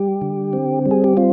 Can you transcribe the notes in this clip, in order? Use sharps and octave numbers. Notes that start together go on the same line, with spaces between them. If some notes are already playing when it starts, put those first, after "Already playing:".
Already playing: G3 G4
D3
C4
G3
G#4
G4
C4 F4